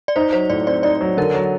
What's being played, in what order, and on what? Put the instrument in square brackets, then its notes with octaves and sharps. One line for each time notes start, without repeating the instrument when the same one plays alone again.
[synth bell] D5
[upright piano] D#4 [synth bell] C5
[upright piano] F#3 [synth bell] C5
[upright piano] A2 [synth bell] D5
[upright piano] C4 [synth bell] D5
[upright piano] D#4 [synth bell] D5
[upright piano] F#3
[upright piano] D3 [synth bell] A#4
[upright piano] F#3